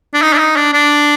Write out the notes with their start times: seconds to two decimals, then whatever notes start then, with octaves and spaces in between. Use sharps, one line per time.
0.14 D4
0.22 D#4
0.33 D4
0.38 D#4
0.56 D4
0.73 D4